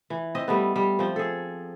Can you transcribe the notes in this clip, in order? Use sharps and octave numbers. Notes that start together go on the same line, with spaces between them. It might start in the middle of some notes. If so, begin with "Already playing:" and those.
E3
C4 D#5 E5
G3 A3 B3
G3
F3 C4
G#4 A4